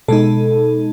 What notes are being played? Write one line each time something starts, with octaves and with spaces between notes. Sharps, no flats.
B2 G#3 D#4 A4